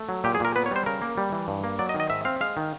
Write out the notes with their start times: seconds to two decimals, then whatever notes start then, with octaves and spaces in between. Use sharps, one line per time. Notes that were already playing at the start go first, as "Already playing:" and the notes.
Already playing: A3
0.09 F#3
0.24 A#2 G4
0.35 G#4
0.40 A#2 A#4
0.56 B3 B4
0.66 C#5
0.71 G3 C5
0.86 C#3 A#4
1.02 A#3
1.18 G3
1.32 E3
1.48 G2
1.64 A#3
1.79 F#3 D5
1.89 D#5
1.94 D#3
2.00 D#5
2.10 G#2 E5
2.25 C4 F5
2.41 G#3 F5
2.57 D#3